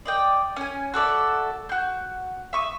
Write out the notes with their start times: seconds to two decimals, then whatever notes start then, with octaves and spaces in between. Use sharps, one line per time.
0.05 D5 D#5 G5
0.56 C#4 G#5
0.94 F#4 A4 D5 E5
1.69 F#4 G6
2.53 E5 C#6 D#6